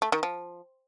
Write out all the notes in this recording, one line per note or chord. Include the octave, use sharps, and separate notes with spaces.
A3
D#3
F3